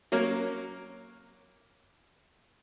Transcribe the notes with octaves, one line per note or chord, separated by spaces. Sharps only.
F#3 A#3 C#4 A#4